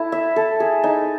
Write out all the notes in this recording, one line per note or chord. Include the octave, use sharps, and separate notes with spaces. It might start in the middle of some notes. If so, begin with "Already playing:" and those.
Already playing: E4 A4
E5
A4
G#4
D#4